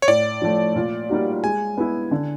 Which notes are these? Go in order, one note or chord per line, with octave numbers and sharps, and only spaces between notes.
C#5
A2 D5
F3 A3
A#2
G3 A#3 D#4 F#4
G#3 G#5
B3 E4
D3